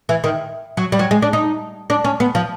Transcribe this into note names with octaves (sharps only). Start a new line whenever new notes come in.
E3
D#3
F#3
G3
F#3
G#3
D4
D#4
D4
C#4
B3
F3